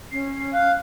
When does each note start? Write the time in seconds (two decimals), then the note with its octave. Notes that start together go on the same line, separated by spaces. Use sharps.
0.12 C#4 C7
0.54 F5 F#6